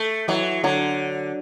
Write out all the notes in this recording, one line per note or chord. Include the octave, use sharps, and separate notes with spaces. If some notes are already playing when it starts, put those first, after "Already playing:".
Already playing: A3
E3 F#3
D3 F#3